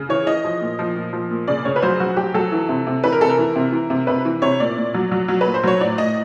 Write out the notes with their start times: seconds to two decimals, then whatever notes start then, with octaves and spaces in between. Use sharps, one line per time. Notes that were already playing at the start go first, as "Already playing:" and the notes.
Already playing: C#3
0.09 E3 C#5
0.26 E3 D#5
0.44 F3
0.61 A#2
0.79 F3
0.96 A#2
1.13 F3
1.30 A#2
1.48 C#3 D5
1.65 C#3 C#5
1.76 B4
1.82 F#3 C5
2.00 F#3 F#4
2.17 F#3 G4
2.34 F#3 A4
2.52 E3
2.69 C3
2.87 C3
3.04 E3 B4
3.12 A#4
3.21 C3 A4
3.29 A#4
3.38 E3
3.56 C3
3.72 E3
3.90 C3
4.07 C3 B4
4.25 E3
4.42 C3 C#5
4.60 A#2 D5
4.77 A#2
4.94 F#3
5.11 F#3
5.28 F#3
5.41 B4
5.46 A#2
5.54 C5
5.63 F#3 C#5
5.81 A2 D5
5.98 A2 D#5